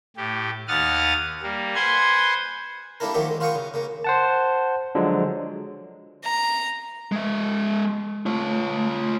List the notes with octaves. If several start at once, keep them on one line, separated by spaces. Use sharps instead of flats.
A2 G4
D#2 F#5 D#6 F6 A6
G3 A#3
B4 C5 F#5 G#5 C6 G#6
G3 A#3 D4 E4 A4 A#4
D#3 F3 F#3 A3 A#3 G4
G#3
F4 F#4 F5 G5 C#6 D#6
C#3
C#3 A#3
C5 F#5 A5
D3 F3 F#3 G#3
A#5
G#3 E5
A3 F4 C#5